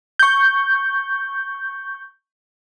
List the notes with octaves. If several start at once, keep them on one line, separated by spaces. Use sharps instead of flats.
C#6 G6